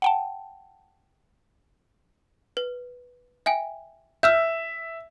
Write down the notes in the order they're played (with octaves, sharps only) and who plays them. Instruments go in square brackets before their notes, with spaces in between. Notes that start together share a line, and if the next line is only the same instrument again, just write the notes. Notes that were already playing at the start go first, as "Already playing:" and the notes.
[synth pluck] F#5 G5 A5
[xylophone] B4
E5 G5 G#5
[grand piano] E5 [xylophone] E6 F6 G6